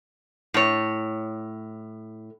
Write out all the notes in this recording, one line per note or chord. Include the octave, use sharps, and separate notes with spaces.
A2 C#5